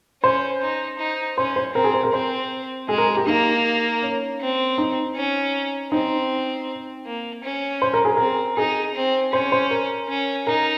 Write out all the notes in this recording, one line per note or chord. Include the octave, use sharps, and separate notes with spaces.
C#4 C5
D#4
D#4
C#4 C5
C5
C4 A#4
G#4
C5
A#4
C4 C5
G#3 G#4
A#4
G#4
G4
A#3 D#4
C#4
C4
D#4
C#4
C4 D#4
A#3
C#4
C5
A#4
G#4
C4 A#4
D#4 G#4
C4
C#4 C5
C5
A#4
C#4
D#4 A#4